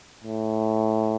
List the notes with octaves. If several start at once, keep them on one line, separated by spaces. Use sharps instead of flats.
A2